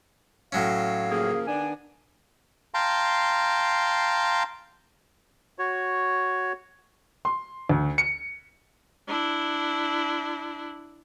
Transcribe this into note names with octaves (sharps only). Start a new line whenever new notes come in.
A2 F#3 C#4 F5
C#3 F3 A#3 G#4
D#3 B3 D4 G#5
F5 G5 A5 A#5 C6
F#4 C#5
C6
D2
C#7
D4 E4